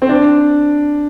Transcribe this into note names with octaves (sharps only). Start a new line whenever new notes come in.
C4
D4